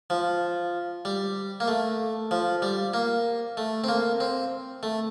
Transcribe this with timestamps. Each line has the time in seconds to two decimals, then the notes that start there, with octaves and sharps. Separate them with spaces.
0.10 F3
1.05 G3
1.60 A#3
1.68 A3
2.31 F3
2.62 G3
2.94 A#3
3.57 A3
3.84 C4
3.88 A#3
4.20 C4
4.83 A3